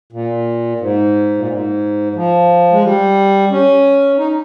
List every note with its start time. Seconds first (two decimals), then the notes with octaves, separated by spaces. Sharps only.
0.12 A#2
0.80 G#2
1.37 A#2
1.48 G#2
2.16 F3
2.72 G#3
2.84 G3
3.51 C#4
4.19 D#4